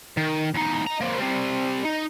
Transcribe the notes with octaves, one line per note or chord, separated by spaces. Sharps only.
D#3
E2 D#4
D#5 A#5
A#3 C4
G3 C4
D#4